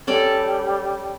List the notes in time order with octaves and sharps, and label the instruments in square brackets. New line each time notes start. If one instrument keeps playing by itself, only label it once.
[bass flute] G3 [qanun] C#4 A4 D5